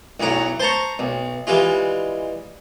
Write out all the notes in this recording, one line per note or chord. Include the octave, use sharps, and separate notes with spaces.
B1 E2 F#3 A#5
C5 A5 A#5 C#6
B1
E3 G3 G#3 F4